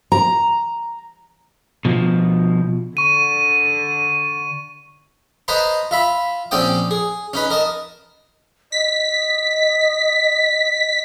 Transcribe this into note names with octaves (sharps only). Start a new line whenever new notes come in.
A#5
B2 F3
D3 C#6 D#7
B4 C5 D#5 A5 A#5 C6
F4 E5 B5
A#1 C4 C#4 D5 G5 D#6
G#4
C#4 D#4 B4
A#4 D#5 A5
D#5 B6